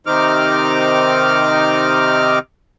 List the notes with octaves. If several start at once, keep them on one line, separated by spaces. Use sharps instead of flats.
C3 D#3 C4 D#4 D6 F6